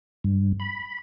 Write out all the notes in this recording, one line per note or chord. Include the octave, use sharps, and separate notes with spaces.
G2
B5